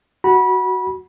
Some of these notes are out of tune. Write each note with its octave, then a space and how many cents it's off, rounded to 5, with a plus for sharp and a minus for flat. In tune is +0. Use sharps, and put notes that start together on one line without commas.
F#4 +5 B5 -25